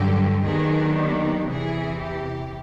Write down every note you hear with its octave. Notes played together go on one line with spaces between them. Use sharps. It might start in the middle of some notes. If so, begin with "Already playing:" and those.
Already playing: G2 D3 F#3 G4
D#2 D#3 F#3 B3 D4 G#4
G4
E2 C3 E3 G#4
G4